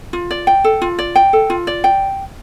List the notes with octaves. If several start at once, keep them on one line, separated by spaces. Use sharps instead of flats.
F4
D5
G5
A4
F4
D5
G5
A4
F4
D5
G5